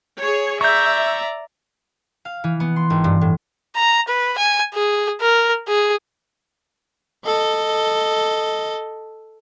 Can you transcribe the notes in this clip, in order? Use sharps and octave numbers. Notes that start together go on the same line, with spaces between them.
G#4 C#5
D5 E5 A#5 C#6 G6
F5
E3
B3
C6
G#1
G2
A2
A#5
B4
G#5
G#4
A#4
G#4
A4 D#5